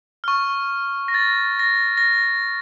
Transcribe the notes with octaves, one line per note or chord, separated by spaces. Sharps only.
C#6 F6
A#6
A6
A#6
A#6